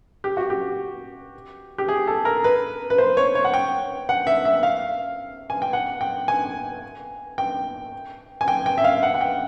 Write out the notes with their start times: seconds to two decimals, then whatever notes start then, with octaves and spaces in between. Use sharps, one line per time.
0.24 G4
0.37 F#4
0.50 G4
1.78 G4
1.88 G#4
2.07 A4
2.25 A#4
2.44 B4
2.90 B4
2.98 C5
3.17 C#5
3.35 C#5
3.44 F#5
3.54 G5
4.09 F#5
4.27 E5
4.45 E5
4.63 F5
5.50 G#5
5.62 G5
5.73 F#5
6.01 G5
6.28 G#5
7.38 G5
8.41 G#5
8.48 G5
8.66 G5
8.78 E5
8.84 F5
9.03 F#5
9.14 F#5
9.21 G5